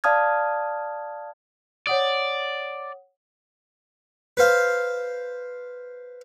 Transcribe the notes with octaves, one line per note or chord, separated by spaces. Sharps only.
D5 F5 A5 D#6 F6 G#6
C#5 D5 F#5 D#6
B4 C5 F5